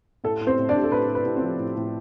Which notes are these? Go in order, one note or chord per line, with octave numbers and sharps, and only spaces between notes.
A2 A4
A2
C4 C5
A2
D4 D5
A2
A4
A2 B4
A2
B4
A2
C4 C5
F3
A2
A2